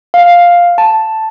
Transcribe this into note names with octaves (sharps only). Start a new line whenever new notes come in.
F5
A5